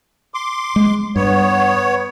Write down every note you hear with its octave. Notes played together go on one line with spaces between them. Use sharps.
C6 D6
G#3
G2 B3 C#5